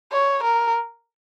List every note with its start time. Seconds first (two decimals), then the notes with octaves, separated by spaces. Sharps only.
0.12 C#5
0.43 A#4